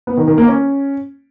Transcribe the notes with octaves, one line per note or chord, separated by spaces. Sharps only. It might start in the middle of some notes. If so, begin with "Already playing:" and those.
B3
D#3
D#3
A#3
C#4